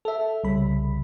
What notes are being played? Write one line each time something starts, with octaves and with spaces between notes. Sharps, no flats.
A4 E5
C2 C#3 G3 B5